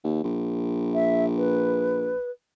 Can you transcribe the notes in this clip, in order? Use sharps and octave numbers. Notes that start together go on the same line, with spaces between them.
D#2
A#1
E5
B4